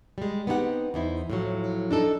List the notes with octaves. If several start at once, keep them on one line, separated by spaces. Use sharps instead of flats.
G3 G#3
B3 C4 D#4 E4 G4 F#5
E2 D#4 E4 C5
A2 F3 F#3
D4 D#4 A4